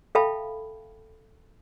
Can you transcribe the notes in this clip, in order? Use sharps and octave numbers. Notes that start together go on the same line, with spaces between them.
A4 E5 F5 G5 A5 B5